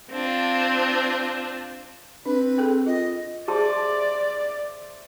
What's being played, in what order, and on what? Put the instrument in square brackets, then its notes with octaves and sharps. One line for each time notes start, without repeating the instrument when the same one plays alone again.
[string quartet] C4 D4 F4
[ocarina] C4 [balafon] D4 [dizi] B4
[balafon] G#4 A4 G5
[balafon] F4 [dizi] D#5
[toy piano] G4 G#4 A5 [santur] C5 E5 [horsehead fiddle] D5